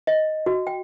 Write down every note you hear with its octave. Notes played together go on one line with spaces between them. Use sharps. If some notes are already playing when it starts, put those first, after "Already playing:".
D#5
F#4
G5